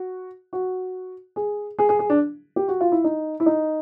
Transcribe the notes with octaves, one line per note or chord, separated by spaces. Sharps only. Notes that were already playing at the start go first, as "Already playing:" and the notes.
Already playing: F#4
F#4
G#4
G#4
G#4
G#4
D4
G4
F#4
F4
E4
D#4
E4
D#4